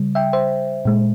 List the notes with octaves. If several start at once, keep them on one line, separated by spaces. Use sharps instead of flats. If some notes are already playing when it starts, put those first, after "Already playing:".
Already playing: C#3 G3
E5 G5
C5 E5
A#2 G#3